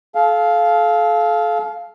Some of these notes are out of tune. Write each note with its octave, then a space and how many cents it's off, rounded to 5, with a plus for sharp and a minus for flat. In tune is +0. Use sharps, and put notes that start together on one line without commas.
A4 -35 F5 +0